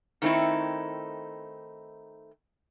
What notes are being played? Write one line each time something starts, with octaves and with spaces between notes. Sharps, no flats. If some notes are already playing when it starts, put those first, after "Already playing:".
D#3 A3 C4 D#4 E4